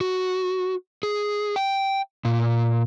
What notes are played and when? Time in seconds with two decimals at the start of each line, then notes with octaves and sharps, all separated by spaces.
0.01 F#4
1.03 G#4
1.56 G5
2.25 A#2